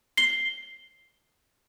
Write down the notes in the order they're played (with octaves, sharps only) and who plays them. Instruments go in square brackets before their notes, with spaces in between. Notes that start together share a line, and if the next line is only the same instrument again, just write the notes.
[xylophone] C7 G7